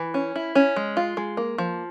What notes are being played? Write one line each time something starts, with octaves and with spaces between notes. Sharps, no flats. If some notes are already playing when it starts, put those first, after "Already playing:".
Already playing: E3
C#4
E4
C#4
G#3
F4
G#3
A#3
F3